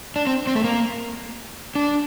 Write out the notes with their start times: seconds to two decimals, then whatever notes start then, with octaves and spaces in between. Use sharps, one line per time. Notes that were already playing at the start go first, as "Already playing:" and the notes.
0.16 D4
0.27 C4
0.47 C4
0.55 A3
0.64 A#3
1.75 D4